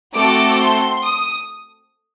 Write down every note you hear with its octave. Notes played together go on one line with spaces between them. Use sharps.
A3 C4 F#4 A4 D6
C6
D#6